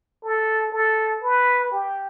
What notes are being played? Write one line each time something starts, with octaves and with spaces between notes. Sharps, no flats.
A4
A4
B4
G4